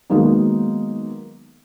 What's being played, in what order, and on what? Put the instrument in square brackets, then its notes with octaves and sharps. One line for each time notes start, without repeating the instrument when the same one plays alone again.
[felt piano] D#3 F#3 G#3 A#3 B3 D#4